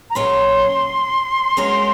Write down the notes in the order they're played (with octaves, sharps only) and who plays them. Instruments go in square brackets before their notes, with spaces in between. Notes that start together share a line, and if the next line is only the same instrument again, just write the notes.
[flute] A#5
[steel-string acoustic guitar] A#2 F#3 C#4 G#4 C#5 [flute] C6
[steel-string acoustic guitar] G#3 C#4 F#4 A#4